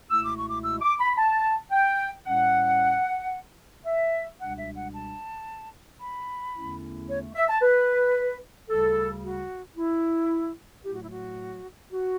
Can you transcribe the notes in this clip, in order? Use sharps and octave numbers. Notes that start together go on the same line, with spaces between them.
C#2 B2 A3 E4 E6
D6
C#6
D6
E6
D6
B5
B5
A5
G5
A2 G3 C#4 F#5
E5
C#2 B2 G3 D4 F#5
E5
F#5
A5
B5
E2 D3 A3 C#4 E4
C#5
E5
A5
B4
D2 C#3 G3 A4
F#4
E4
A2 F#3 A3 E4 G4
F#4
E4
F#4
F#4